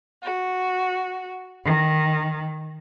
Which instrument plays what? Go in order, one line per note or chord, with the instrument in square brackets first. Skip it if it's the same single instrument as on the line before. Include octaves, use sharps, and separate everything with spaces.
[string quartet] F#4
D#3